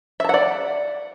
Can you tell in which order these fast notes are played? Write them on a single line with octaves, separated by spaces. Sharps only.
E5 A5 F#5 D5